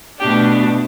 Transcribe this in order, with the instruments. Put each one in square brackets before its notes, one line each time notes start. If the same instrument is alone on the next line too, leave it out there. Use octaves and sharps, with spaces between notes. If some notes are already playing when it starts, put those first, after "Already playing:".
[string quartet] B2 A3 D4 G4